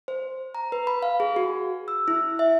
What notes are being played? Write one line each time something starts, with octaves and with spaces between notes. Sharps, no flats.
C5
A#5
B4
B5
F5
G#4
F#4
E6
E4
E5